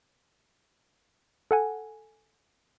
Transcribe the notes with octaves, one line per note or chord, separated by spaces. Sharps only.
A4 F#5 G#5